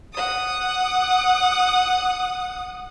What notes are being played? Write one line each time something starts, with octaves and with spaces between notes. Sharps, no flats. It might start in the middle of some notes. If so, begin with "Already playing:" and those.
F#5 D#6